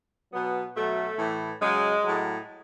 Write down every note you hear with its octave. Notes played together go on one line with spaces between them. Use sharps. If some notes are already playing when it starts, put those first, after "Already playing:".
B2 F#3 B3
B2 F#3 A3
A2 E3
C#3 F#3 G#3
A2 F#3